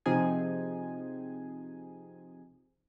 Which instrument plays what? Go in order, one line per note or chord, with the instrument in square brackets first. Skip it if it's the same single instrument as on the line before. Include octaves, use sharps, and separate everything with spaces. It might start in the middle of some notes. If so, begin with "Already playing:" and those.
[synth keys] C3 F3 C4 D#4 G#4 G#5